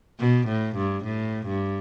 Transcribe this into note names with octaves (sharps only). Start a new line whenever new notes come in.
B2
A2
G2
A2
G2